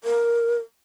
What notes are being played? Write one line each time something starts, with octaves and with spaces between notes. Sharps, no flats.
A#4